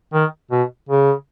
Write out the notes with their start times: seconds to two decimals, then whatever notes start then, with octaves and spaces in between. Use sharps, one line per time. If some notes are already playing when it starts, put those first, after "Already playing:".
0.13 D#3
0.51 B2
0.89 C#3